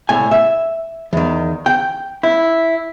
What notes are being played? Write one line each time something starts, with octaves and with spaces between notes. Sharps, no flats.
C2 A2 G#5
E5
E2 D#3
G5
E4